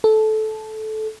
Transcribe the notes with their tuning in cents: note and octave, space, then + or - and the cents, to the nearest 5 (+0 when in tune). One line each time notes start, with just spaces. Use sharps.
A4 -15